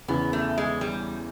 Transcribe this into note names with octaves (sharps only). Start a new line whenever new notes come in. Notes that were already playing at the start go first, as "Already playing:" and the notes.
E2 C#3 E3 B3
A3
G#3
G3